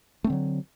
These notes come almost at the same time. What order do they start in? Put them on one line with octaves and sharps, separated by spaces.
A3 C4 D3 F#3